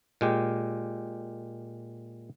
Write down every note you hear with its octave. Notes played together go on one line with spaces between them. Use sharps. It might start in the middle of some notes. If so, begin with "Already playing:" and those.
A#2 G#3 G4